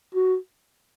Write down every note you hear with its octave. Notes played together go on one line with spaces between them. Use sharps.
F#4